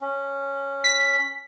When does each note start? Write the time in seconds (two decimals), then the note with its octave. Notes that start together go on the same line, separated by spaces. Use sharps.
0.01 C#4
0.84 B6